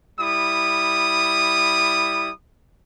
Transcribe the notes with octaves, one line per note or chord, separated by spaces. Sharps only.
G3 E4 D#6